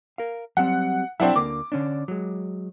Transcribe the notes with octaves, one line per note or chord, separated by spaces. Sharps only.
A#4 F5
F#3 G3 C4 F#5
B1 F#3 C4 D4 E4 F#5
D2 D3 A#3 D6
D3 C#4 D4
F#3 G#3